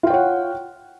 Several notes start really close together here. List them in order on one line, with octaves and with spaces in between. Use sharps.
F4 G5 C#5 F#5